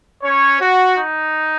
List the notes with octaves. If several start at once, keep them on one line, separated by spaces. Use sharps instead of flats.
C#4 C#5
F#4
D#4